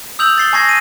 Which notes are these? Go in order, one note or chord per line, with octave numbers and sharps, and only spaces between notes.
D#6 E6 G6 F7 F#7
A6 C7 G7
G#5 A5 C#6 G#6 A#6 C7
A#6 D#7